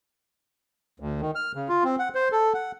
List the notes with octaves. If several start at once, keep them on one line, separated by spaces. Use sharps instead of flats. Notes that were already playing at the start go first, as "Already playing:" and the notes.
D2
D#3
F6
C#3
F4
C4
F#5
C5
A4
F#5